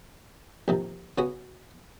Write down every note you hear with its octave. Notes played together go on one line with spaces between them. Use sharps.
A#1 C3 D#3
C#3 B3 C#4 F#4